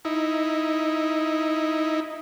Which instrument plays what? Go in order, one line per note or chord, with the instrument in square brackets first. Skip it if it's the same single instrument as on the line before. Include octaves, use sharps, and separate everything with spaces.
[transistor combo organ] D#4 E4